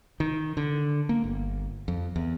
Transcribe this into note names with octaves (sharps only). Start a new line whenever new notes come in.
D#3
D3
A#3
G1
F2
E2